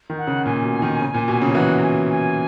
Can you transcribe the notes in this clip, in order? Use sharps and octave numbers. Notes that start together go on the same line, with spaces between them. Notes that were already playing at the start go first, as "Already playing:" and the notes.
D#3
F#5
C#3
A#2 G#5
B2
D#3
C#3
A#2
B2
C#3
F#3
E3 F#5
A#5
G#5
G#5